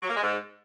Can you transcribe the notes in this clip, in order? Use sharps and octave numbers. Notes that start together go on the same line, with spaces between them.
F#3
A#3
G#3
G#2